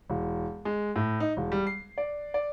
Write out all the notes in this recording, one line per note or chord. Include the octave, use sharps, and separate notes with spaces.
E1
G#3
A2
D#4
E1
G3
C7
D5
D5